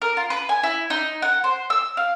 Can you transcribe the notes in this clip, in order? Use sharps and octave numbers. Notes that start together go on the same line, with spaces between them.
A#4
F4
B4
G#5
E4
D#4
F#5
C5
E6
F5